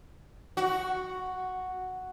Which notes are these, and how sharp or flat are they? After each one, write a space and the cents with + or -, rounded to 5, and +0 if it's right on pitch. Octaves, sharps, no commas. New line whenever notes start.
F#4 +0